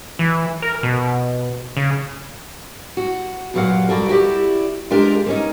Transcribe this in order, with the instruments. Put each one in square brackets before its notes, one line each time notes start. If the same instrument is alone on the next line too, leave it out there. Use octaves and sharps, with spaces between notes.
[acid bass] E3
A#4
B2
C#3
[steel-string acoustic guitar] F#4
G2 A#2 F#3 G#4 F5 F#5
G3 F#4 A4 A#4
E4 F#4 G4 D5
G#3 D4 F4 G4 A#4
A#3 C#4 D#4